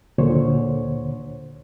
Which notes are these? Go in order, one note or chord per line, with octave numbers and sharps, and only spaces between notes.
D2 A#2 D3 C5 C#5